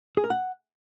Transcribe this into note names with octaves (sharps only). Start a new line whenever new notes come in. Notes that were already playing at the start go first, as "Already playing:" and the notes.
G#4
A#4
F#5